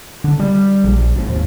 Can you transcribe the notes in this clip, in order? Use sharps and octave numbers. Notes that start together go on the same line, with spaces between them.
D3
G3
A#1
G#1
D#2